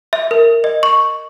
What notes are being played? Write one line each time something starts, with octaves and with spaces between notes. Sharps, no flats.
E5
A#4
D#5
C#6